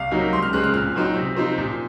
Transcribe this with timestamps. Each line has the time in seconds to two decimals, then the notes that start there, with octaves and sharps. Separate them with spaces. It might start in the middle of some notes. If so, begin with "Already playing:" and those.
Already playing: C2 F5
0.11 C3 F#3 A#3 D#4
0.33 C#2 C6
0.42 F6
0.53 C#3 G#3 C4 F#6
0.64 F6
0.74 A#2 F6
0.95 F#3 C4 D#4
1.15 C3
1.36 F3 C4 D#4
1.58 A#2